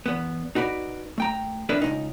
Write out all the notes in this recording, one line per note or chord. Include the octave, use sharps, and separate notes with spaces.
E2 B3
D#4 F#4 B4 D5
A3 G5 A#5
D4 A#4 B4 E5
C#2 C3 D#4